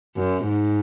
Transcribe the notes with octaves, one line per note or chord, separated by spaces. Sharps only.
F#2
G#2